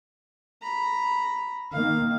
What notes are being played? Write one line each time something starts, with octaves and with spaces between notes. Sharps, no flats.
A#5 B5
D#3 A#3 F5